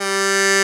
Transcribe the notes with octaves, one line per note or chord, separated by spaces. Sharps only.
G3